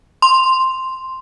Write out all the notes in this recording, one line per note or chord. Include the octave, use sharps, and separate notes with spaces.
C6